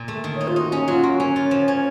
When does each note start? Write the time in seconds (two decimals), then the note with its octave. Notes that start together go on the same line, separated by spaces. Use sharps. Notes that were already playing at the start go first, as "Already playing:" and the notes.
Already playing: A#2
0.08 A3
0.24 D#3
0.36 D#4 C#5
0.48 F4
0.56 D#4 F#4
0.72 C#4 F#4
0.83 F#4
0.88 F#3 F4
1.03 A#3 F#4
1.20 C#4 C#5
1.36 F4
1.51 F3
1.68 C#4